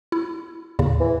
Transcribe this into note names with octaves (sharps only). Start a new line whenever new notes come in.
E4
D#2 A2 C#3
E3